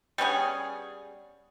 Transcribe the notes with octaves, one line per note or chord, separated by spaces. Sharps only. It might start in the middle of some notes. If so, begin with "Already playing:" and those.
G3 B3 C#4 G#4